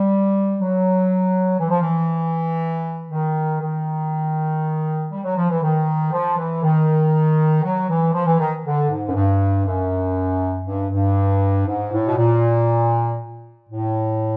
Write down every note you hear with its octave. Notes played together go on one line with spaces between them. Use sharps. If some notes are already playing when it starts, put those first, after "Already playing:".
Already playing: G3
F#3
E3
F3
E3
D#3
D#3
G3
F#3
F3
E3
D#3
F3
E3
D#3
F#3
E3
F3
E3
D#3
D3
G#2
F#2
G2
F#2
G2
G2
G#2
A2
B2
A#2
A2